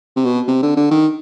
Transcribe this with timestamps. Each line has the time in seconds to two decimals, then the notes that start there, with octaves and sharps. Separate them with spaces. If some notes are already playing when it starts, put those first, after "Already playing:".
0.16 C3
0.25 B2
0.48 C3
0.62 D3
0.77 D3
0.91 D#3